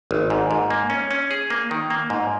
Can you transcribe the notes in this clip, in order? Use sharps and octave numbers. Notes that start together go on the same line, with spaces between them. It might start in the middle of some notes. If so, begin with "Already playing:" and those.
G#1
G#2
G#2
A#3
C#4
C#4
G#4
A#3
D#3
A#3
G#2